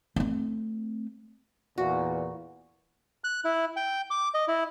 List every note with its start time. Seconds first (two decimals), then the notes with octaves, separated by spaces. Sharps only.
0.16 A3 C4
1.78 E2 A#2 F#4
3.24 F#6
3.44 E4
3.76 G5
4.10 D6
4.34 D#5
4.48 E4